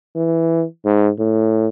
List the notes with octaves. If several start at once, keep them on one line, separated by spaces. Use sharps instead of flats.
E3
G#2
A2